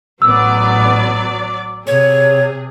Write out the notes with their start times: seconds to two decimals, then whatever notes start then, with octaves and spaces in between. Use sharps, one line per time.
0.22 A1 F#3 B3 D5 E6
1.87 C3 G#4 C#5